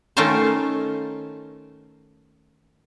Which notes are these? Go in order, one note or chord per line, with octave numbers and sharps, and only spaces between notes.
D#3 A3 C#4 D#4 F4 C5